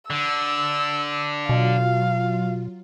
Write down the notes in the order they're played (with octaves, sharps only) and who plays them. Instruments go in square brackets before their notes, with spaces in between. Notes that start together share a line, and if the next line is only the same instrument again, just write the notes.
[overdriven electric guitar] D3 [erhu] E6
[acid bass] B2 [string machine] F#3 F4 [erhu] F5